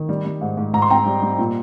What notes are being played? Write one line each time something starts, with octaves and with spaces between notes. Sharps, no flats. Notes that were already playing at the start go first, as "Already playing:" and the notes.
Already playing: D#3
G3
G3
G#2
G#2
G#2 A#5
C6
C4 G5 A#5
G3
G3
A#2